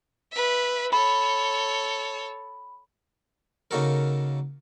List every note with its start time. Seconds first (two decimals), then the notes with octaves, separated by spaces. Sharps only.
0.32 B4 E5
0.93 A4 C#5 B5
3.71 C#3 A#3 D#4 F#4 A4 A#4